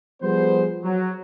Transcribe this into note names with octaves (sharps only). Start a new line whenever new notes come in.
F3 G3 B3 G#4 C5
F#3